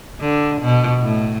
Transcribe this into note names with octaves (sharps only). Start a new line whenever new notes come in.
D3
B2
A2